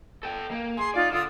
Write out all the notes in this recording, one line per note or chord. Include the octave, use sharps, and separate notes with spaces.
A4 G5
A#3
G#4 C6
D#4 F4 D5
D3 F4 D#6 E6